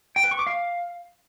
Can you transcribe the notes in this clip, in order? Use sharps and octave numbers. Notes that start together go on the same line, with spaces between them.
G5
B4
C#6
D6
F5